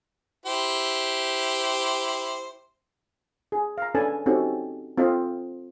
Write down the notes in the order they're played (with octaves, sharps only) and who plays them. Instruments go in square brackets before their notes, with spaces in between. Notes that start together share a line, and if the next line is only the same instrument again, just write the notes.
[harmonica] E4 G4 C5
[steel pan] G#4
F5 A#5
C#4 D4 A4 B4 G#5 A5
C4 C#4 D#4 F#4 G4 A4
C4 F4 A4 D#5